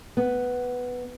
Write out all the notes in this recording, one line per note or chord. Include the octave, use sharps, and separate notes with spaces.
B3